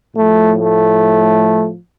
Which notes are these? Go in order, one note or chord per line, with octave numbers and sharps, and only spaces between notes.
A2 F3 A3
A3